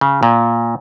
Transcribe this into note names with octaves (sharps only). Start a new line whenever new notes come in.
C#3
A#2